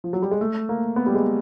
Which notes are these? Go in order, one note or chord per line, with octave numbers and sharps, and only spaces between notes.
F3
F#3
G3
G#3
A3
A#3
B3
G3
G#3